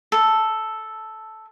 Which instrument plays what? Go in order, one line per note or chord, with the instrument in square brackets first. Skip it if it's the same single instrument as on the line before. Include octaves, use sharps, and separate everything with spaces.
[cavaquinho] A4